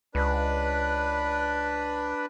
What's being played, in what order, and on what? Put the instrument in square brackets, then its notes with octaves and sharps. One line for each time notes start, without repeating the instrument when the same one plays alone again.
[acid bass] C#2 [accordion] D4 B4